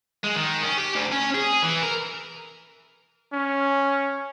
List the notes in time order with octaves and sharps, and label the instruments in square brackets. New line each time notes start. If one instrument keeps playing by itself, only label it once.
[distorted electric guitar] G#3
D#3
C#4
G4
D2
C#4
G#4
E3
A#4
[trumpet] C#4